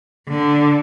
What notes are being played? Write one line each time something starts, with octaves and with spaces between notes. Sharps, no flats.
D3